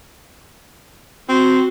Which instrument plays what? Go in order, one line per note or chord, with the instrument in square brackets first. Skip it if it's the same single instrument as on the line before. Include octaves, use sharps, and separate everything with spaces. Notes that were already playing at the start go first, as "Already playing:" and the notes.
[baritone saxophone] C4 [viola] F#4